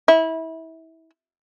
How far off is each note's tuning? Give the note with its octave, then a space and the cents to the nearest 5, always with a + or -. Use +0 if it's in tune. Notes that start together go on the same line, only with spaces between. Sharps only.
E4 -25